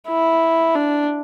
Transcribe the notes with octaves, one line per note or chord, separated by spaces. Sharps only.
E4
D4